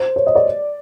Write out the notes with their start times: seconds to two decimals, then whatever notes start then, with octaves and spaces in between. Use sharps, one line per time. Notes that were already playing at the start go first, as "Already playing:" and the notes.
Already playing: C5
0.16 C#5
0.27 D#5
0.35 D5